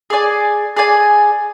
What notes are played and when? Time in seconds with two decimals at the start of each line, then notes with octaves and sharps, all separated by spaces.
0.10 G#4 D5 G#5
0.77 G#4 D5 G#5